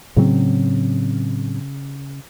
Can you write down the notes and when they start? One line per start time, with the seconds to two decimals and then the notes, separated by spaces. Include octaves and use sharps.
0.17 A2 C#3 F#3 C4